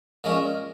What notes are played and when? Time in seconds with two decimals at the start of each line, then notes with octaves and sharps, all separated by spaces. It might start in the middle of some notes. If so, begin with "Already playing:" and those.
0.24 A#2 G#3 C#4 A#4